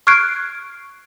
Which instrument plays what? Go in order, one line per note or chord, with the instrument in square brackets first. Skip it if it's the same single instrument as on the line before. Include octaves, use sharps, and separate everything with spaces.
[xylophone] C#6 F6 F#6 G#6 C7 D7